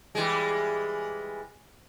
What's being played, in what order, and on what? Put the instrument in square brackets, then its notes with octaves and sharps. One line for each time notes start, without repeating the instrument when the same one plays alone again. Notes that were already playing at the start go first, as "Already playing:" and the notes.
[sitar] E3 G3 G#3